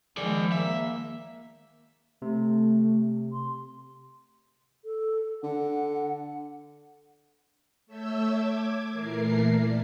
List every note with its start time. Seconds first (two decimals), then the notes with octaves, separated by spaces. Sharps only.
0.17 D#3 F3 G#3 G#4 D5
0.52 A#3 E5
2.22 C3 A3
3.32 C6
4.85 A4
5.43 D3 F#5
7.86 A3 A4 C#5 E5 E6 G6
8.27 D6 G#6
8.91 A#2 E3 A3 A#4 C7
9.50 D5